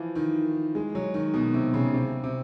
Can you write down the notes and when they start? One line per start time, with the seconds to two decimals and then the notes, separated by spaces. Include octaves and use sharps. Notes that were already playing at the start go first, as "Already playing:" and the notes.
Already playing: E3 F3
0.15 D#3
0.75 G#3
0.95 F#3
1.14 D#3
1.34 B2
1.54 C3
1.74 C#3
1.94 C3
2.24 C3